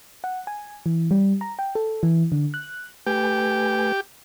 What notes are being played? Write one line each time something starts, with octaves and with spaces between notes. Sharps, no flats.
F#5
G#5
E3
G3
A#5
G5
A4
E3
D3
F#6
A3 G4 B4 G#5